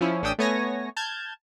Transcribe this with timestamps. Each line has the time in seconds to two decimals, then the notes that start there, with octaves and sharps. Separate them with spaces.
0.01 F3 C#4 E4
0.22 A1 C#4 D4 G5 D#6 E6
0.39 A3 B3 C#5 G#5 A#6
0.96 A5 F6 G6 G#6